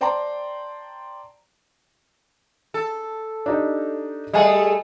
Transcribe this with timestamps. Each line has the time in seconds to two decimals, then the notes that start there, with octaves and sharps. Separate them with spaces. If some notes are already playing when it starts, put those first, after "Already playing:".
0.01 C5 D5 G5 A5 A#5 C6
2.74 A4
3.46 D4 D#4 G4
4.33 G3 A3 G#4 D#5 G#5